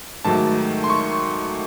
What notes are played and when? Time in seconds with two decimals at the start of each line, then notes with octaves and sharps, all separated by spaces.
0.25 G#2 D#3 F#3 A3 A5
0.84 C6
0.90 C#6